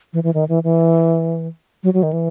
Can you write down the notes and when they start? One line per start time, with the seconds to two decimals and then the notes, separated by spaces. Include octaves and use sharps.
0.13 E3
0.23 E3
0.34 D#3
0.49 E3
0.64 E3
1.83 F#3
1.94 F#3
2.03 D#3
2.13 E3